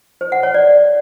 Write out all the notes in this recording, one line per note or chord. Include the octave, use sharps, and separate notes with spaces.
C5
F#5
C#5
D5